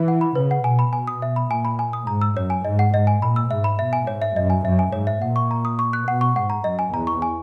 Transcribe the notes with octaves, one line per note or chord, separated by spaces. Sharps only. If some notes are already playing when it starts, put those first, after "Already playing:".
Already playing: E3
F#5
B5
C#3 B4
F#5
B2 G#5
B5
B2 G#5
D#6
E5
B5
A#2 G#5
B5
G#5
D#6
G#2 A#5
E6
F#2 C#5
G#5
G#2 D#5
F#5
G#2 D#5
G#5
A#2 B5
E6
G#2 E5
B5
B2 E5
G#5
G#2 C#5
E5
F#2 D#5
G#5
F#2 E5
G#5
G#2 C#5
E5
A#2 F#5
C#6
A#5
D#6
C#6
F#6
B2 F#5
C#6
G#2 F#5
A#5
F#2 D#5
G#5
E2 A#5
C#6
G#5